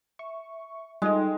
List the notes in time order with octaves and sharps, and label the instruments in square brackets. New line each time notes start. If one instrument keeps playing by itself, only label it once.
[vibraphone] E5 [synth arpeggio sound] C#6
[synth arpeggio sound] G3 F4 D#5 [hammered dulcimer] G#3 [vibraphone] D#4 A4 G5